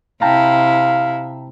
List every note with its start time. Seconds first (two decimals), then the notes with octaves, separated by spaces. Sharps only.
0.22 C3 E4 F5 G5 A5 A#5